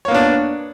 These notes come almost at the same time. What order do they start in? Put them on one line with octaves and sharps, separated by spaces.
C#5 A#3 B3 D4